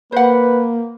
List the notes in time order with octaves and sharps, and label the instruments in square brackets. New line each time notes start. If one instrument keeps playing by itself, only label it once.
[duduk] A#3 [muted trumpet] B4 [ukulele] C5 F#5